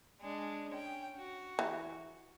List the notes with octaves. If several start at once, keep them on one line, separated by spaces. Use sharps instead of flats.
G#3 D4
C#4 G5
F#4
E3